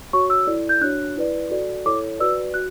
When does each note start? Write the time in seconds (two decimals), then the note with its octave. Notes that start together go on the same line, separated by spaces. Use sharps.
0.13 F#4 C#5 C#6
0.30 E6
0.47 E4 A4 D5
0.69 G6
0.81 D4 F#4 C#5 F#6
1.16 E4 B4 D5
1.50 F#4 A4 D5
1.86 E4 A4 C#5 D6
2.19 F#4 B4 D5 E6
2.54 F#4 F#6